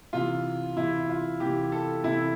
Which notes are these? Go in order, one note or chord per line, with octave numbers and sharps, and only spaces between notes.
C3 E3 F4
C3 E3 E4
F4
C3 E3 G4
A4
C3 E3 E4